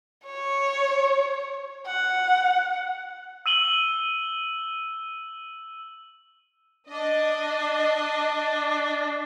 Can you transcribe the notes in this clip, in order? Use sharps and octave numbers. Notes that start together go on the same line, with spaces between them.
C#5
F#5
E6 D#7 F#7 G7
D4 D#5